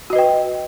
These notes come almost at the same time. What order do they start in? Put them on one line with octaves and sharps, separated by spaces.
F#4 D#5 B4 G5